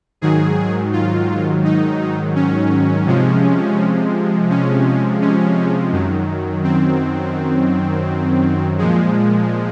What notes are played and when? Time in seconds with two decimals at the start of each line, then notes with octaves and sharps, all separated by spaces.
0.21 G#2 D#3 F#3 G#4
0.93 F4
1.64 D#4
2.36 C#4
3.07 C3 F3 G#3
4.50 C#4
5.21 C#4
5.92 F#2 D#3 F#3
6.64 C4
8.78 A#2 F3 G#3